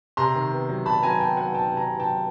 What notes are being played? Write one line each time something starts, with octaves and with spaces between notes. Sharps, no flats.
C3 A#5 C6
D#3
B3
F#3
C3 A5 B5
F#3 G#5 A#5
B3 G5 A5
F#3 F#5 G#5
D#3 G5 A5
C3
G#5 A#5
C3
G5 A5
F#3